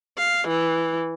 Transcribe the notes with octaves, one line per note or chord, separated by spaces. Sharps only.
F5
E3